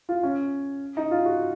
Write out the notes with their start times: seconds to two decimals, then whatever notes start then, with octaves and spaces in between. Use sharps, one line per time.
0.09 F4
0.23 C#4
0.97 D#4
1.11 F4
1.26 F#4